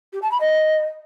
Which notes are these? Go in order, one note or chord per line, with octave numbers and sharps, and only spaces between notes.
G4
A5
B5
D#5